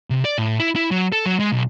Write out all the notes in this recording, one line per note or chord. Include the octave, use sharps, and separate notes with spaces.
C3
D5
A2
E4
E4
F#3
A4
F#3
G#3
B1